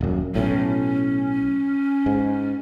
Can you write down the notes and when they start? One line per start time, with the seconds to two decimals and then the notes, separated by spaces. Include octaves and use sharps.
0.01 D#1 F#2
0.35 B1 A2 C#4
2.06 G#2